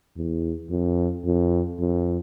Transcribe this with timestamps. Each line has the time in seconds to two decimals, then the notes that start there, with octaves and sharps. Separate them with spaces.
0.16 E2
0.70 F2
1.25 F2
1.79 F2